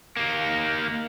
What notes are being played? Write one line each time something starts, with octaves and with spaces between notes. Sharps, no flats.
A#3 D#4